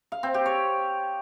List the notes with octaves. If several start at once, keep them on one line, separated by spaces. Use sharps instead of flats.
F5
C4
G4
C#5